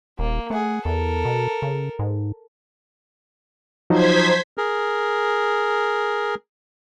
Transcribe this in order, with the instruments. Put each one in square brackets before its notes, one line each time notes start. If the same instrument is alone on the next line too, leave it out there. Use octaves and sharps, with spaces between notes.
[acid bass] D#1 [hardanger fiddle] A#3
[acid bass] A3 [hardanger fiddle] G#4 F#5
[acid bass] E2 [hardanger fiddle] A4 A#4
[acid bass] B2
C#3
G#2
[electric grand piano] F3 F#3 D#4 [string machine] C5 G#6 B6
[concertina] G#4 A#4